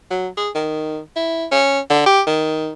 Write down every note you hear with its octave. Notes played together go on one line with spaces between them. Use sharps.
F#3
G#4
D#3
E4
C#4
D3
G4
D#3